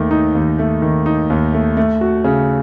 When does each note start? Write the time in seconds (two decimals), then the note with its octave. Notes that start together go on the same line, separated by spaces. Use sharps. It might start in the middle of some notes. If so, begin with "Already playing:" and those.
Already playing: D#2 D#3 A3
0.11 D#4
0.35 D#2
0.59 A3
0.82 D#3
1.06 D#4
1.30 D#2
1.54 A3
1.77 A3
2.01 F#4
2.24 C#3